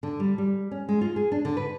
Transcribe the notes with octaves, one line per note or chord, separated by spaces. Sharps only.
D3
G3
G3
C#4
G#3
F4
G#4
D4
D3
B4